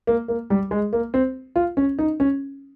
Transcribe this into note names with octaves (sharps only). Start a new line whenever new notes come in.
A#3
A#3
G3
G#3
A#3
C4
F4
C#4
D#4
C#4